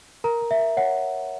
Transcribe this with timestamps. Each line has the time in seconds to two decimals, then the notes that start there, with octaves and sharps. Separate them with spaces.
0.24 A#4 A#5
0.41 A#4
0.51 E5
0.59 A#4
0.77 C#5 F#5